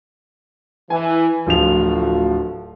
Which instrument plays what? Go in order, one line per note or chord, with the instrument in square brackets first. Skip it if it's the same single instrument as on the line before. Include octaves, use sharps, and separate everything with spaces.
[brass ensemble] E3 [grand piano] G#5
[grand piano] D1 F3 F7 [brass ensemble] A3 F4 F#4